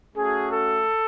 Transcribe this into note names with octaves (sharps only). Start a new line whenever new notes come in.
A3 C#4 F#4 G#4
A4